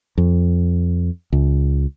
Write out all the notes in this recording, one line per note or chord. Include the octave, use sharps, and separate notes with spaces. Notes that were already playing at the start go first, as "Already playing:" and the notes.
F2
C#2